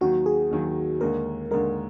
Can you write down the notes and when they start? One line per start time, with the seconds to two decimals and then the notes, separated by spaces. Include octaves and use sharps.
0.01 D#2 D#3 F#3 F#4
0.26 G#4
0.51 D#2 D#3 F#3
1.01 D#2 D3 G#3 A#4
1.51 D#2 D3 G#3 A#4